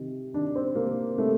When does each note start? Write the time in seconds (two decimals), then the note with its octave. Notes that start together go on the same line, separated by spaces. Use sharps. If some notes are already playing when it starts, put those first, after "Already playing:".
Already playing: C3 D#3
0.34 D#3 D4
0.55 C4
0.75 C3 A#3
1.18 C3 A3